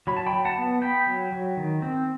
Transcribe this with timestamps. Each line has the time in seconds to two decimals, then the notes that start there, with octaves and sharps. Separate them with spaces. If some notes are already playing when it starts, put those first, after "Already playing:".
0.07 F#3 B5
0.17 A5
0.26 G5 B5
0.33 F#3
0.45 F#5 A5
0.58 B3
0.82 B3 G5 B5
1.06 F#3
1.32 F#3
1.57 D#3
1.82 C4